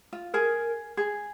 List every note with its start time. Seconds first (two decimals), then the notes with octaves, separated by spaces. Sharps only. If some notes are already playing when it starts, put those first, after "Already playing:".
0.13 F4
0.34 G#4 A#4
0.97 G#4